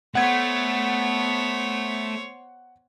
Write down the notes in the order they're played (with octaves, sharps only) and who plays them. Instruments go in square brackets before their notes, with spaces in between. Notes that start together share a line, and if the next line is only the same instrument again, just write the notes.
[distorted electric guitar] A3 [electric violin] B3 [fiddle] C5 C#5 [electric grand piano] F#5 G#6